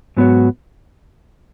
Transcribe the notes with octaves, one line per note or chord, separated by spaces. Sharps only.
G#2 F#3 B3 F#4 C#5